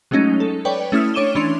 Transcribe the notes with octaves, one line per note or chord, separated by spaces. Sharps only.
F#3 G#3 A3 C#4 D#4
A4
B4 C#5 D5 G5
A3 C#4 E4 D#6 F6
D4 C#5 D6 D#7 E7 G7
E3 C#4 D4 C6 F7